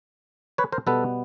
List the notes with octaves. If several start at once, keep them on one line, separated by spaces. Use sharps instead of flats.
B4 C#5
A#4 C5
B2 G3 B3 A4 B4